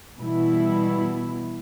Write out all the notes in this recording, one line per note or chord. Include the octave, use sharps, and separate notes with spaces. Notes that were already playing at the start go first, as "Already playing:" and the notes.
B2 E3 G3 E4